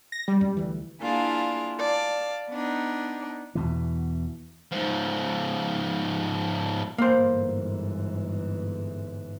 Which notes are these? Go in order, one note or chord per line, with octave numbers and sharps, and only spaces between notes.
A#6
G3
F#2 G#3
D2 E3
A#3 D4 E4 F4 G#4 F5
D5 F5 A5
B3 D4 D#4
E2 B2 E3
G#2 F3
G1 G#2 E3 A#3 C5